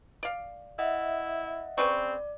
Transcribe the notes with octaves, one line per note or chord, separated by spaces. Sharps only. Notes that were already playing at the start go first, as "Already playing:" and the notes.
D5 F5
E4 D#5 E5 F#5
C#3 C4 B4 D5 C#6